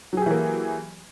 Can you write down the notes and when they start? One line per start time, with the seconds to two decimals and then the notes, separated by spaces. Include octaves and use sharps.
0.13 F#3
0.17 G#4
0.22 G4
0.26 E3
0.31 A#3